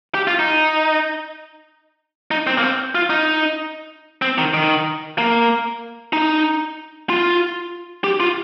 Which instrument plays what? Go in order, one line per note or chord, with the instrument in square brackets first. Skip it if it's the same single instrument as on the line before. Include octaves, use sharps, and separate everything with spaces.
[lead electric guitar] G4
F4
D#4
D#4
C4
A#3
C4
F4
D#4
C4
D#3
D#3
A#3
D#4
F4
G4
F4